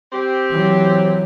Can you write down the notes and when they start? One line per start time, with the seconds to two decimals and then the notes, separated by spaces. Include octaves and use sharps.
0.13 C4 G4
0.52 E3 F#3